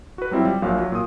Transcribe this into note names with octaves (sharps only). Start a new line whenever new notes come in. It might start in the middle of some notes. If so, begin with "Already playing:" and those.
F#4 B4
F#3 G3 C4 E4 F4
G3
A#1 A#2 F#3 F5
F#3
A#2 D#6